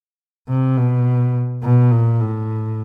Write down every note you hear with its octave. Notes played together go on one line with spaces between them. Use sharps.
C3
B2
B2
A#2
A2